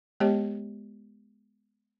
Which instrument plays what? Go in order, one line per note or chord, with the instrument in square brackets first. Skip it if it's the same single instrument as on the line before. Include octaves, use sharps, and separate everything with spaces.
[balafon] G#3 B3 G4 C#5 D#5